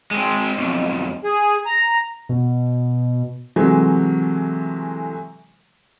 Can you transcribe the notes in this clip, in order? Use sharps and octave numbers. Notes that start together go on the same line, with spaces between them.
G#3 C4
B1 F2
G#4
A#5
B2
C3 E3 F#3 G#3 A3